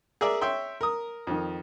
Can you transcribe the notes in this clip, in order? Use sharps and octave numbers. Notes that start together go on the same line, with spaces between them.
G#4 A#4 D5 E5
C#5 E5 G5 C6
A#4 D#6
F2 D#3